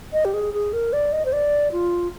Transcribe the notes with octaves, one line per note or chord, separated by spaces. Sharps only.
D#5
G4
G#4
G#4
A#4
D5
D#5
C5
D5
F4